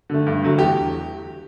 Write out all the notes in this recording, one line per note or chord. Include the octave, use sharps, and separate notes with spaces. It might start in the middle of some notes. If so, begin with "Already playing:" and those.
D3 A3
G2
D3 F#3 A3
E2 G4